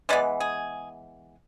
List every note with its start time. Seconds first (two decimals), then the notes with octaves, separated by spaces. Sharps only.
0.09 E3 G#3 B3 D5
0.40 G#4